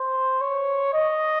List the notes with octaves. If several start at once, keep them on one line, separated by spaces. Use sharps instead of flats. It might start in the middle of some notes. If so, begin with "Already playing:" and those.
Already playing: C5
C#5
D#5